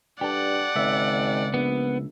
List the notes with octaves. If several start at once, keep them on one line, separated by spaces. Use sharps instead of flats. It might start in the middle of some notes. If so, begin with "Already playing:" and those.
G2 G4 A4 D5 F#5
G#1 C#2 E5
A#1 B3